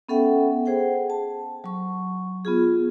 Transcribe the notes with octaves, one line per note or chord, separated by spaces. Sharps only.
B3 C#4 A4 E5 F#5 G5
G#4 C5 F#5 G5
A5
F#3 C#6
B3 F4 G#4